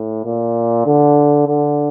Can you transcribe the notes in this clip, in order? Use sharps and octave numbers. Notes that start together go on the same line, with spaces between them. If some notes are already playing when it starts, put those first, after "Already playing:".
Already playing: A2
A#2
D3
D3